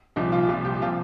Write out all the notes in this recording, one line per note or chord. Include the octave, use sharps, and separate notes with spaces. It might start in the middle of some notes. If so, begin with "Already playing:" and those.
C2 A#2 F3 D#4
F4
C2 A#2 F3 F4
G4
C3 F3 F4